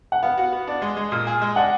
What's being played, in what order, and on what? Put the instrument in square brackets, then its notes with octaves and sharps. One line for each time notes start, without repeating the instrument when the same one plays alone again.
[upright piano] F#5
[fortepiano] B3 [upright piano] F5
[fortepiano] F#4
B3
D4
G#3
G#3
A#2
G#4
G#3
[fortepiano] D4 [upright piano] F#5